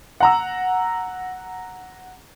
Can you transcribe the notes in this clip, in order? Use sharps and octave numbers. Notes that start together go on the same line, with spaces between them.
F#5 A#5 E6